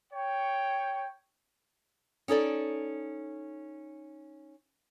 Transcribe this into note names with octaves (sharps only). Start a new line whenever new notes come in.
C#5 G5
C#4 D#4 A4 D5